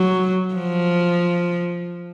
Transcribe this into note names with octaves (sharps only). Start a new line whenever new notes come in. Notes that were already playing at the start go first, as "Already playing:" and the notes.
Already playing: F#3
F3